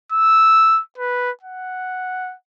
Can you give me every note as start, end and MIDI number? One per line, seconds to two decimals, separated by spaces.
0.12 0.81 88
0.98 1.31 71
1.42 2.35 78